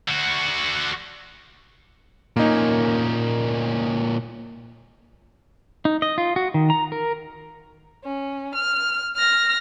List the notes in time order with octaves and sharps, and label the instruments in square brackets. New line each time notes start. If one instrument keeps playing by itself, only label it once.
[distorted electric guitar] D3 F#4
[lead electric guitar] A#2 C#4 [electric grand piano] A#3 D#4
[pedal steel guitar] D#4
D#5
F4
F#4
D#3
A#5
A#4
[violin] C#4
F6
F6 A#6